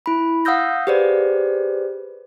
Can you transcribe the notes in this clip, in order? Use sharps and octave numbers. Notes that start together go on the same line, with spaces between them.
E4 B5
F5 F#5 D#6 E6 G6 A#6
G4 G#4 B4 C5 D5